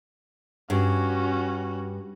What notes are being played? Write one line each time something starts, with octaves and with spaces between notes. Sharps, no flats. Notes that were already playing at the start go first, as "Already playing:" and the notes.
G2 C#4 F#4